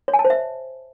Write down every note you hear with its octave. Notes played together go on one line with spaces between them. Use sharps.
C#5
G#5
A5
C5
E5